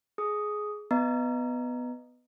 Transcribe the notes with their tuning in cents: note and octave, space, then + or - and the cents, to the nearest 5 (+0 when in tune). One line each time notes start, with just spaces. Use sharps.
G#4 +15 D#6 +0
B3 +10 D#5 -15 A#5 +0